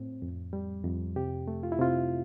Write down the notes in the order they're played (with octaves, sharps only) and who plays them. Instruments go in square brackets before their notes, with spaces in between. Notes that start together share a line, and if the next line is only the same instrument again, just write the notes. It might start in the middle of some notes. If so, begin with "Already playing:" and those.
Already playing: [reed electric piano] A2 C4
F2
G3
F2
C3 G4
A3
F4
E4
C3 F4